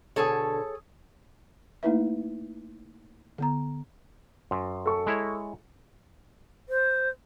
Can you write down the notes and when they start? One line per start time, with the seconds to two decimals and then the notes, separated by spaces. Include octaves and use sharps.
0.16 B2 D3 G#4 A4 C#5
1.83 A3 A#3 D#4 E4 B4 E5
3.38 D3 B3 A#5
4.51 F#2 C6
4.86 A4 C#6
5.07 G#3 E4 C#5
6.69 C5